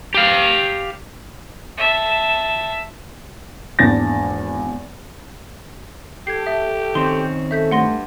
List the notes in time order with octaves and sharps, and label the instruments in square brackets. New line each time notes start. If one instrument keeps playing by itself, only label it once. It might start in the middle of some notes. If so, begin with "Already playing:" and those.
[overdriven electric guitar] G4 F5
[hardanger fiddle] E5 A5
[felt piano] G#1 E2 A#3 D4 A6 A#6
[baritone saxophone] G4 [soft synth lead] A4 [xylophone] G#6 C7
[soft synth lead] A4 [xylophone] E5
[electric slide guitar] D#3 C4 C#4 [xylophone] C6
[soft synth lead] A4 [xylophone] E5 G6 B6
[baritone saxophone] G2 [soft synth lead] A3 [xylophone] F#5 C6 A#6